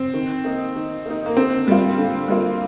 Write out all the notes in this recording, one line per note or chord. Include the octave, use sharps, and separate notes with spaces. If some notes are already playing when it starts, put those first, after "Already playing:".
Already playing: C4
D#3
A#3 D#4
D#3
A#3 D#4
A#3
D3 C4
G3 A#3 F4
D3
G3 A#3 F4